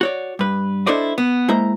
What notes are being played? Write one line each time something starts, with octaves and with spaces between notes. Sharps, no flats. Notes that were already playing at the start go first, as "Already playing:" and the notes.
F#4 C#5 D5
G2 B4
D4 E4 A4 C5 D5 D#5
B3
G#3 A#3 E4 C5 A#5